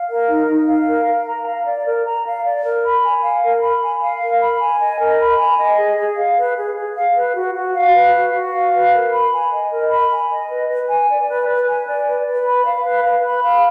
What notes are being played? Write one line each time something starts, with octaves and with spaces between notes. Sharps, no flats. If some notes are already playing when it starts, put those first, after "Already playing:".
Already playing: F5
A#4
D#4
D#4
F5
A#4
A#4
A#5
F5
D5
A#4
A#5
F5
D5
A#4
B5
G#5
F5
A#4
B5
G#5
F5
A#4
B5
G#5
D#5
A#4
B5
G#5
D#5
G#4
G#4
F5
B4
G#4
G#4
F5
B4
F#4
F#4
F5
B4
F#4
F#4
F5
B4
A#4
B5
G#5
D#5
A#4
B5
G#5
D#5
B4
B4
G#5
D5
B4
B4
G#5
D5
B4
B4
B5
F5
B4
B4
B5
F5